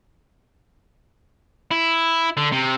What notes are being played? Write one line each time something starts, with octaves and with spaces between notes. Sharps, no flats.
E4
D3
C3